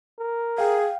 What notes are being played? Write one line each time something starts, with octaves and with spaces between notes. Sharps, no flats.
A#4
G#4 F5 G5